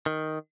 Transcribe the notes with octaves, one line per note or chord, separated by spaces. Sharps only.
D#3